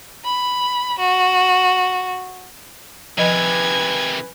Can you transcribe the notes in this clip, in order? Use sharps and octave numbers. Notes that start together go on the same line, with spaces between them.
B5
F#4
C3 D#3 F3 B4 D#5 G#5 G#6